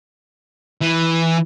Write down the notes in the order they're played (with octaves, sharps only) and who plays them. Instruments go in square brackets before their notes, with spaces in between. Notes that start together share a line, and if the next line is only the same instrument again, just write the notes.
[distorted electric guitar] E3